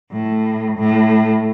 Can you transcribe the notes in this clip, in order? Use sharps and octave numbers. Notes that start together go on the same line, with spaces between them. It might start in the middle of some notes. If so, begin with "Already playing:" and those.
A2
A2